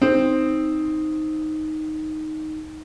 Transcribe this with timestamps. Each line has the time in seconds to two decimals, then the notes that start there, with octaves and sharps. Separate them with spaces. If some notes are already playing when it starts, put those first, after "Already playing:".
0.02 C4 D#4